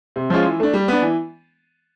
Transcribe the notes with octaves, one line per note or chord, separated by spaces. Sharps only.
C3
F3 G#3 C#4 F4
E3
A3 D4
G3
B3 D4
E3